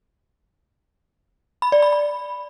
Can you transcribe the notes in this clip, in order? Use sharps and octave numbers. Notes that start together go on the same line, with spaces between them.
B5
D5
B5
B5